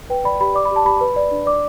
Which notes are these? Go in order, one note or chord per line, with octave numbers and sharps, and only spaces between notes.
B4 G5
D5 B5
G4 B5
D5 D6
B5
G4 A5
G4 B5
B4
D5
D4
D5 D6